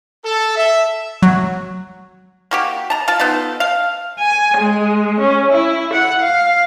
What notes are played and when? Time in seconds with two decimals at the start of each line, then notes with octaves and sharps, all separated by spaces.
0.24 A4
0.56 E5
1.23 F#3
2.51 A#3 F#4 G4
2.90 A5 A#5
3.08 F4 A5
3.20 B3 D#4 F4 A4
3.60 F5
4.20 G#5
4.58 G#3
5.20 C#4
5.50 E4
5.94 F#5
6.23 F5